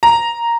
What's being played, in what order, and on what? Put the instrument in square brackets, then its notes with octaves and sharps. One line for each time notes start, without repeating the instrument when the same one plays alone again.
[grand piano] A#5